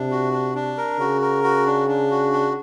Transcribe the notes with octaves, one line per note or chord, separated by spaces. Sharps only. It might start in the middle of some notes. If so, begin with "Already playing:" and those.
Already playing: C3 D4
F#4
D4
D4
A#4
C#3 F#4
A#4
F#4
D4
D4
F#4
D4